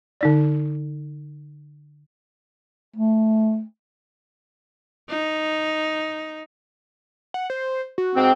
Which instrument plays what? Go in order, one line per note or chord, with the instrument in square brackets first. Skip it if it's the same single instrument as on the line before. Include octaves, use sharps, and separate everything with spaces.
[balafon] D3 D#4 D5
[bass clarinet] A3
[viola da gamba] D#4
[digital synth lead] F#5
C5
F#4
[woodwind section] G#2 C4